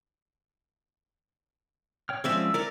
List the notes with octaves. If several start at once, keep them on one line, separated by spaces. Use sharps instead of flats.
C#5 G5 F6
F3 G#3 C4 C#4 D5 E5 E6
A#4 D5 A#5